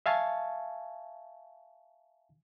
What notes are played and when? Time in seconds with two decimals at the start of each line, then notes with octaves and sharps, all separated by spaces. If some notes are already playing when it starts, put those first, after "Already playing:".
0.06 E5 F5 G#5 A5 C#6